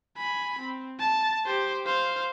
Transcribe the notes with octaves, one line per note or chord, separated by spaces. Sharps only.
G#5 B5
C4
A5
G4 C5
C5 F5